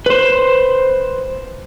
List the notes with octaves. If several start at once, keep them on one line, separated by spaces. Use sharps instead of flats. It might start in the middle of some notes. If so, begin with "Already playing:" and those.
B4 C5